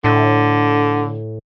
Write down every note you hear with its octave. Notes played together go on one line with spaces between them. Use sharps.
A2 D3